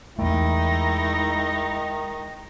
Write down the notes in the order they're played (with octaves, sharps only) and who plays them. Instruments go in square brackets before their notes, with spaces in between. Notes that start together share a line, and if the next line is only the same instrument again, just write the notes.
[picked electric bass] E2 A3 [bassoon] D#3 [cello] G#3 D#4 [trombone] E4